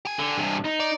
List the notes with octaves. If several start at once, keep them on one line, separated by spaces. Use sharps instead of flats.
G4 G#5
D3
G2 C3
D#4
D5